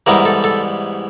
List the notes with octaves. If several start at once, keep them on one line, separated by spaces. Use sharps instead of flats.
G#2 E3 G3 B3 E4 A#4
A4
A4